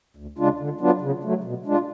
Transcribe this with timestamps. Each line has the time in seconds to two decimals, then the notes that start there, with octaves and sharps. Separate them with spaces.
0.17 D2
0.38 C#3 G#3 D4 F4
0.59 D3
0.81 F#3 B3 D4 F4
1.01 C#3
1.23 F#3 A3
1.44 B2
1.65 G#3 D4 F4